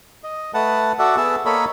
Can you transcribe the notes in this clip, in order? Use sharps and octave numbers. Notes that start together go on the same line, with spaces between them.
D#5
A3 B4 F#5 A5
F#4 A4 D5 E5 F#5
B3 G#4 E5 A5
A#3 A4 A#4 C#5 D#5 B5